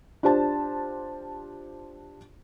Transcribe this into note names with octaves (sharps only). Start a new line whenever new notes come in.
D4 F4 G4 C5 A5